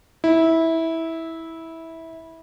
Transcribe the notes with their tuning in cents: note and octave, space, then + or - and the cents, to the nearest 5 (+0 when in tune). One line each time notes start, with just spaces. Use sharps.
E4 -15